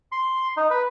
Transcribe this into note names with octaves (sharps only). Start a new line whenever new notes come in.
C6
D#4
B4